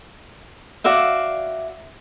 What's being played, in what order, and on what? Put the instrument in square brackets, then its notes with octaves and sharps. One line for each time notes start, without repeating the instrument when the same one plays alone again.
[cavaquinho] F#4 D5 E5 F5